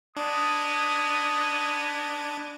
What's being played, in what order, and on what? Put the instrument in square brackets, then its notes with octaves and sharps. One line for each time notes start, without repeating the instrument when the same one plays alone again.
[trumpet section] G#3 B3 [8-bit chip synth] D4 [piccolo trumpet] D#6